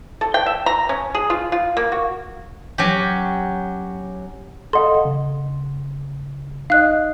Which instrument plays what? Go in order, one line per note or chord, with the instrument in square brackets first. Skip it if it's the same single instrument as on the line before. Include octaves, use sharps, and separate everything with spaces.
[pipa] A4
G5
E5
A#5
C#4
G#4
F4
F4
A#3
F#4
[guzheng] F#3 C#4 G4
[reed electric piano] A4 D#5 F5 [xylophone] F#5 C6
[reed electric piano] C#3
[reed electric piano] D#4 D#5 [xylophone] F5 F#6